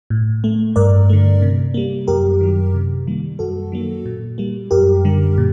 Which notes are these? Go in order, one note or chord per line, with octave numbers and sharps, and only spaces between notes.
A2
A3
G2 A#4 D5
D3 A3
C3
G3 A#3
F#2 G4 A#4
D#3 F#3
C3
D#3 G3 A#3
F#2 F#4 A4
D#3 F#3 A#3
A#2
G3 A#3
F#2 G4 A#4
D3 G3
A#2